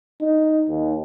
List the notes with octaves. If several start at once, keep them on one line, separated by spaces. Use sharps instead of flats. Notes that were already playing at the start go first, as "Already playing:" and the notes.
D#4
D#2